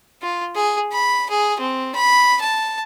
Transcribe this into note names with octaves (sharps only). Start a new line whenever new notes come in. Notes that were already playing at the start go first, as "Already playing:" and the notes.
F4
G#4
B5
G#4
C4
B5
A5